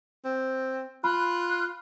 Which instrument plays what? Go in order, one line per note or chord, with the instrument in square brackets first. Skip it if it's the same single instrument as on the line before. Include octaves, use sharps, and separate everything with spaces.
[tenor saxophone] C4
[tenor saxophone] F4 [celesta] B5 [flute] F#6